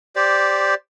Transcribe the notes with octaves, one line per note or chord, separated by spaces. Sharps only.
G4 C5 D5